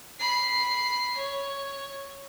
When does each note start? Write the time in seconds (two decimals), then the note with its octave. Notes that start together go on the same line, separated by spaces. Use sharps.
0.20 B5 C7
1.17 C#5